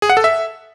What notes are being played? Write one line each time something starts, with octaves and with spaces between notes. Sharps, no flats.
G#4
F#5
A4
E5